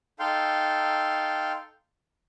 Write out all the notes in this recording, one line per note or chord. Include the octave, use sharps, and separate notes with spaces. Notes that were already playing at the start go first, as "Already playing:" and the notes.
D#4 A4 F5 G5 C6